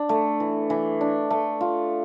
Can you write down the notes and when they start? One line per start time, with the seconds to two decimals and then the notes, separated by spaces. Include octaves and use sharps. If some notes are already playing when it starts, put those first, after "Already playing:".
Already playing: D4
0.09 A3
0.40 E3
0.70 E3
1.01 D4
1.30 A3
1.61 F4